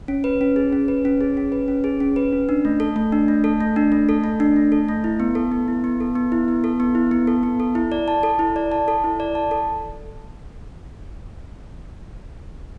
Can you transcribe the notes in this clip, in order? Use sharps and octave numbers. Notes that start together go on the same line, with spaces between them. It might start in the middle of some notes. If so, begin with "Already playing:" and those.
C#4
B4
C#4
G#4
C#4
B4
C#4
G#4
C#4
B4
C#4
G#4
C#4
B4
C#4
D4
A3
A4
A3
D4
A3
A4
A3
D4
A3
A4
A3
D4
A3
A4
A3
E4
B3
A4
B3
E4
B3
A4
B3
E4
B3
A4
B3
E4
B3
A4
B3
A4
E4
D5
A5
A4
E4
D5
A5
A4
E4
D5
A5
A4